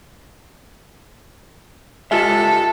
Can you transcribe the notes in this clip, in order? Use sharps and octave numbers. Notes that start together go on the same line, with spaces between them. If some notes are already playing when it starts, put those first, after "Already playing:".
C#2 G#3 F4 G4 A4 D#5 E5